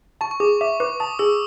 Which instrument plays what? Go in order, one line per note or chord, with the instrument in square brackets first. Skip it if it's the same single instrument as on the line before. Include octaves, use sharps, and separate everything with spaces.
[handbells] A5 [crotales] C#6
[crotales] C#6
[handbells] G#4 [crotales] D6
[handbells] E5 [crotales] D6
[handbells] B4 [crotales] D6
[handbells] A5 [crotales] D#6
[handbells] G#4 [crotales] E6